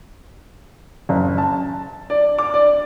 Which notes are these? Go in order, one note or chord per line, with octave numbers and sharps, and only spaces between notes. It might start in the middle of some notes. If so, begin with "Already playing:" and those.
F#1
A5
D5
D6
D5